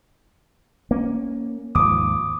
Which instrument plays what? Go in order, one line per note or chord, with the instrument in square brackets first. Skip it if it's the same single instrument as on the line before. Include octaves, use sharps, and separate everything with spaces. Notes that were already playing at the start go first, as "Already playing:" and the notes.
[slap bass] A#3 C#4
[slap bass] D#2 G#2 F3 [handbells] D6 D#6